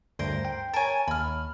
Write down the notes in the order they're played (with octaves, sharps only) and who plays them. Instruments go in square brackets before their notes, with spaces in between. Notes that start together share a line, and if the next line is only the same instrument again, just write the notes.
[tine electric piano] D2 G2 [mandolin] A#4 C5 C6
[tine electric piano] G5
[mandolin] A#4 G#5 [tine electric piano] C#5 A5
[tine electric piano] D#2 [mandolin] B5 F6